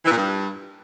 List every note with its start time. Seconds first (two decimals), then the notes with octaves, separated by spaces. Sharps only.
0.05 E3
0.11 A#2
0.17 G2